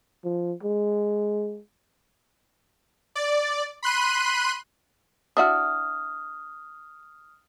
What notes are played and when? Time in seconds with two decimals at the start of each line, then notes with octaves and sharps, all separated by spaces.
0.24 F3
0.63 G#3
3.15 D5
3.83 B5 C6 F#6 D#7
5.37 D4 E4 F#4 D#6 F6